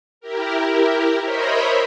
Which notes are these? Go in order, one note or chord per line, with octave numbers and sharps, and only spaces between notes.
E4 G4 A#4
A#4 C5 C#5 D#5 E5 B5